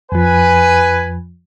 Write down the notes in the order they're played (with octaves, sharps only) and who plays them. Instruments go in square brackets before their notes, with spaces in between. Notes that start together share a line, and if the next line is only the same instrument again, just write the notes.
[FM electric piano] F2 F3 [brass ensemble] B4 G#5